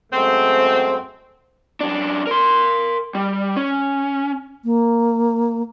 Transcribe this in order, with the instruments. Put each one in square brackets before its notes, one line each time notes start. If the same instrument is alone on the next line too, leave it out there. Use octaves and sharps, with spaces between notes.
[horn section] F#2 G#3 A3 C4
[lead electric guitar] F#2 D4
A#4 C6
G3
C#4
[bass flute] A#3